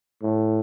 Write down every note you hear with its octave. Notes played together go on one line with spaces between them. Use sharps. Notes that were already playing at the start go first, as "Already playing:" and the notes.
A2